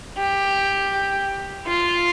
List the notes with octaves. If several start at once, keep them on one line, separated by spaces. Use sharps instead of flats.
G4
F4